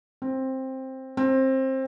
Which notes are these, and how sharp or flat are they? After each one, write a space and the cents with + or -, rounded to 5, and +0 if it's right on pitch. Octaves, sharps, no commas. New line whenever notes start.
C4 +10
C4 +20